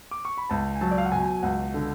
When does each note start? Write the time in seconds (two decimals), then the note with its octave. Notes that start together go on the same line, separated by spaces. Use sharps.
0.11 D6
0.25 C#6
0.38 B5
0.50 C#2 A5
0.76 G#5
0.81 F#3 A5
0.91 D5
0.98 F5
1.05 F#5
1.12 B2 G#5
1.43 C#2 F#5
1.74 D3